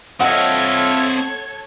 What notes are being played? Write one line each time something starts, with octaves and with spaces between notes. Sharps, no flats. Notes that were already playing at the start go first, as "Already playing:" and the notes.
C4 F4 A4 C#5 D#5 E5 F#5 G#6